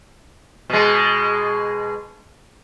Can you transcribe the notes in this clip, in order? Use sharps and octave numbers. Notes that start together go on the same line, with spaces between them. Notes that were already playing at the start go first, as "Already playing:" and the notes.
B2 G#3